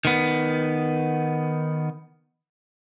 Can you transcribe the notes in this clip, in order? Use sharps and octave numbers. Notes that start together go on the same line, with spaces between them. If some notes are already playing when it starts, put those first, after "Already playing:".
D#3 B3